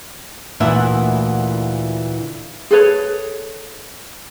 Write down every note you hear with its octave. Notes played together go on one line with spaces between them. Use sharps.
D2 A#2 E3 E4 E5 F#5
G#4 A4 B4 C#5